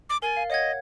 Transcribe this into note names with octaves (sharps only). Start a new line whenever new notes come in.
D6
A#4 G#5 A6
F5
C#5 D#5 F#5 G#6